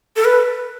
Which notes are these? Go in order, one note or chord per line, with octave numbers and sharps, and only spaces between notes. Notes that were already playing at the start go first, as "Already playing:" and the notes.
A4
B4